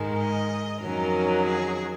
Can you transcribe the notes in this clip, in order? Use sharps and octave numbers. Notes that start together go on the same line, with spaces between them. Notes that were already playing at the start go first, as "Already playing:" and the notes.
Already playing: G#2 D#3 G#3
D#5
F2 D#3 F#3 C#4 A#4
G#4